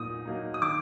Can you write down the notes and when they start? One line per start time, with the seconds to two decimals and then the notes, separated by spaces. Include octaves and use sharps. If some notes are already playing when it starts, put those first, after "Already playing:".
Already playing: A#2 F#3 A#3 D#4 D#6
0.25 F#3 A#3 D#4
0.54 D#6
0.62 D#3 D6